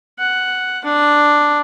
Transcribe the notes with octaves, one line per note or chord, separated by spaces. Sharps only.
F#5
D4